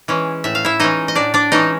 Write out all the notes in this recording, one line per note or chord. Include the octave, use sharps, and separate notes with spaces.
E3 G#3 C#4
A2 E5
F5
E4 E5
E3 G#3 C#4 D#4 D#5
D#5
A2 D4 D5
D4 D5
E3 G#3 C#4 D#4 D#5